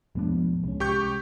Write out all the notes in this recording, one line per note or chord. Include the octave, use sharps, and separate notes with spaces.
E1 A2 F3 G#3 B3 D4
C2 G#3 C#4
G4 C#6 G6